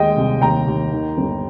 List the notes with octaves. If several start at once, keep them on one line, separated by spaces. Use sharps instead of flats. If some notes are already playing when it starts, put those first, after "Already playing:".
Already playing: D#2 G#3 D#5 G5
C2
D#2 G5 A#5
D#2
D#3
G1